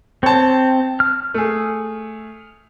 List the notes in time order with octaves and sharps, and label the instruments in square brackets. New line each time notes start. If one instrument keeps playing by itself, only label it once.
[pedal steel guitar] C4 [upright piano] C#5 A5
[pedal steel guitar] F6
[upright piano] A3 G#4